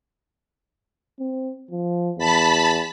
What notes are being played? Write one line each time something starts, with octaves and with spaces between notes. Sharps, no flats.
C4
F3
E2 A5 B5 B6